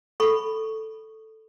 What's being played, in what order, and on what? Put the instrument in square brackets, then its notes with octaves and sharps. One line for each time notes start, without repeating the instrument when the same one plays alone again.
[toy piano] A4 B5 C#6